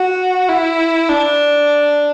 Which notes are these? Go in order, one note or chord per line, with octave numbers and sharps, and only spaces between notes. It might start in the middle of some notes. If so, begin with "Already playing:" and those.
Already playing: F#4
E4
D4